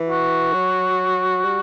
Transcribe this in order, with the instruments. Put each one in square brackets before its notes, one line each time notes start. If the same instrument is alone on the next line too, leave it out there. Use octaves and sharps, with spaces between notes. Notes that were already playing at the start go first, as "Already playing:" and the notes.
Already playing: [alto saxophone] E3
[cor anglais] F#4
[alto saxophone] F#3
G3